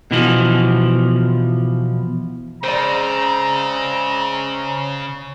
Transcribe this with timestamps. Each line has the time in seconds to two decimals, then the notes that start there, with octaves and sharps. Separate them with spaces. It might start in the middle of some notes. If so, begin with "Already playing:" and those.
0.11 B2 E3 F3
2.64 C#3 G#3 C4 C5 D5 A#5